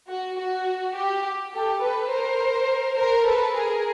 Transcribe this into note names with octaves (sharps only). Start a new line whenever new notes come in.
F#4
F#4
G4
G4 A4
A4 B4
A#4 C5
A#4 C5
A4 B4
G#4 A#4